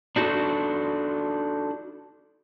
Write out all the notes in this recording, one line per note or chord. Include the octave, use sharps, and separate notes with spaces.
D4 D#4 F#4 A4